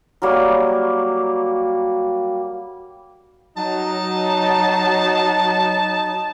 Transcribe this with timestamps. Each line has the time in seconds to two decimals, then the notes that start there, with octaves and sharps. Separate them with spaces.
0.22 F#3 G3 A#3 C#6
3.57 F#3 D#4 A5